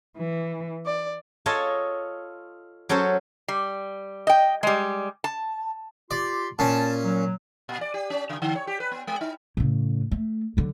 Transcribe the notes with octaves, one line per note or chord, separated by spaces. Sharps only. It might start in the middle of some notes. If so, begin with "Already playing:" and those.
E3
D5
F4 A4 C#5 D#5 G#5 A5
F#3 C#4 A4 C5 C#5
G3
D#5 G5
G3 G#3
A5
F4 G4 D5 C6
A#2 C#4 A5
F#3
A#2
D5
G4
C#4
C#3
D3
C#5
G4
B4
B3
G#3
D#4
A2 C#3
A3
D3 F#3